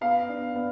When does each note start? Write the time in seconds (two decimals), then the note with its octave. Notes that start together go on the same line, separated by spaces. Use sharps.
0.01 B3 F5
0.29 D4
0.55 B3